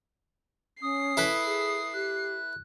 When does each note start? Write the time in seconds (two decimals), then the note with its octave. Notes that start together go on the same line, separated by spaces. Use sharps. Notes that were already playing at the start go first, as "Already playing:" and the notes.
0.82 C#4 D#6 C7
1.17 E4 A4 B4
1.46 G#4
1.94 G4 F#6